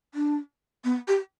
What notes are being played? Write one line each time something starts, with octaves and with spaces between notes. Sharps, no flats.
D4
B3
G4